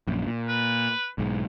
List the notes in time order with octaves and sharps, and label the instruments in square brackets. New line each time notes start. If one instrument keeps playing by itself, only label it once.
[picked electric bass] A#1 F#2
A#2
[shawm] B4
[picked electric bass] B1 G#2